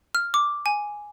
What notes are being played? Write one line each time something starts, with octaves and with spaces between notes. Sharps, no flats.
F6
D6
G#5